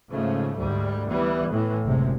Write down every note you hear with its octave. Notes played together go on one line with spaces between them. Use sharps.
G#2 C#3 F3 A3
D2 G#2 G3
E3 G3 B3
A2 E3
F#1 D2 C3 G#3